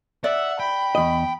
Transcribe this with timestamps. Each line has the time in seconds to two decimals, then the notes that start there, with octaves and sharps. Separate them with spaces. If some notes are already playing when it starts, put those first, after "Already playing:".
0.24 D5 E5 F#5
0.60 G5 B5
0.95 E2 D#5